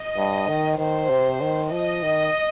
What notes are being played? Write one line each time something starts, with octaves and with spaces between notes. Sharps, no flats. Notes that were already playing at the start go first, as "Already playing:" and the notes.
Already playing: D#5
G2
D#3
D#3 C5
C3
D#3
F3 D#5
D#3